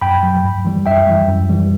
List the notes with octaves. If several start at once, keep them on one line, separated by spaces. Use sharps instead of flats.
F#2 G5 B5
F#3
G2
E3 G3
F#2 E5 G5
E3 G3
F#2
E3 G3